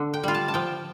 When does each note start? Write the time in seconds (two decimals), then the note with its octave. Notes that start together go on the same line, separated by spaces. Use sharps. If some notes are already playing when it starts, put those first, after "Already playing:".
Already playing: D3
0.14 G5
0.23 G3 F4
0.34 A5
0.48 A5
0.54 F3 G5